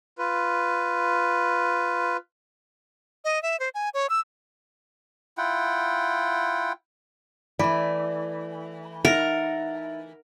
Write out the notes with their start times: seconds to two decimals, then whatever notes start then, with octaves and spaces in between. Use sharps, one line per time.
0.18 F4 B4
3.25 D#5
3.43 E5
3.60 C5
3.74 G#5
3.94 C#5
4.10 E6
5.38 E4 F4 F#5 G5
7.59 E3 A3 D5
9.05 D#4 A#4 E5 F#5 A6